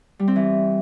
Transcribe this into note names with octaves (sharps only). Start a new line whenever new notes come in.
G3
C4
E3